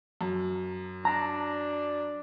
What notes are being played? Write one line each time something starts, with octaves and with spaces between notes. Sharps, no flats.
F#2
D4 A#5